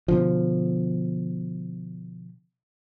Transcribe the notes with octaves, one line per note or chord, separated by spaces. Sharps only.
B2 D3 F3